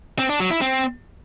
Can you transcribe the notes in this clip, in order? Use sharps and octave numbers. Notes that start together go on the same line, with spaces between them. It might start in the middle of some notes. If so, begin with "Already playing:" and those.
C4
D4
F#3
E4
C4